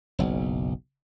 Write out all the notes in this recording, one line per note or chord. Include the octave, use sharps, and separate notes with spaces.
F#1 B1